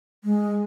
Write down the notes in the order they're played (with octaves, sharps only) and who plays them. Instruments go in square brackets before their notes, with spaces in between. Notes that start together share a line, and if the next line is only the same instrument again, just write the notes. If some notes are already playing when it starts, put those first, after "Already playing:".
[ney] G#3